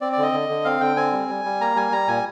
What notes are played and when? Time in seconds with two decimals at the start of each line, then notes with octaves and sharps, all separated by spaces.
0.01 C4 D5
0.12 D5
0.18 D3 D#5
0.33 D3
0.49 D3
0.65 C4 F5
0.81 D3 G5
0.96 C4 G#5
1.13 G3
1.29 G3
1.45 G3
1.61 A#3 A#5
1.76 G3 G#5
1.92 G3 A#5
2.08 A#2 G#5